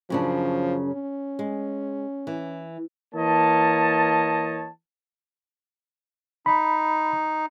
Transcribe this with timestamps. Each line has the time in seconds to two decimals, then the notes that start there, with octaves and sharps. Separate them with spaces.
0.10 F#2 C#3 F3 D4
0.85 C#4
1.39 G#3
2.27 E3
3.15 E3 A#3 C#5 D#5 A5
6.46 D#4 B5